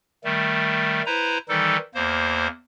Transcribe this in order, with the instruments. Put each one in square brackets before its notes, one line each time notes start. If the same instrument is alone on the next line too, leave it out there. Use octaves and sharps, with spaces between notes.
[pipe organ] D#3 G3 A3
E4 B4 C5 A#5
D#3 E3 G3 D#4 A4
E2 A#3 C5